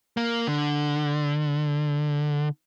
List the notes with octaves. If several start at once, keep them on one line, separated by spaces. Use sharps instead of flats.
A#3
D3